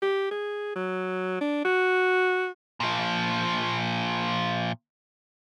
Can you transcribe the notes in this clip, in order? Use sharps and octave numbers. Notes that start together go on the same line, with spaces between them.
G4
G#4
F#3
D4
F#4
A#2 F3